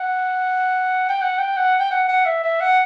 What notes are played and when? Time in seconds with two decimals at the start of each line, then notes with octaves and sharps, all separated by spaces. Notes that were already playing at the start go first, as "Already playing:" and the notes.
Already playing: F#5
1.09 G5
1.21 F#5
1.38 G5
1.56 F#5
1.80 G5
1.91 F#5
2.08 F#5
2.26 E5
2.43 E5
2.61 F#5